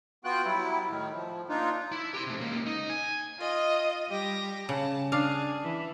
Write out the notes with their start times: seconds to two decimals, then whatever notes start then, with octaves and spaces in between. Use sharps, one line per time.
0.25 B3 F4 F#4 G5 F#6
0.44 F#3 G3 E4
0.89 A2 D#3
1.15 F3
1.49 A#3 D4 D#4 F4
1.92 E4
2.13 G4 C6
2.27 C3 A3
2.39 C#2 A#3
2.66 D#4
2.90 G#5
3.39 F4 D#5
4.08 G3 G4 A#6
4.69 C#3 A5
5.12 D4 G#4 F5
5.63 E3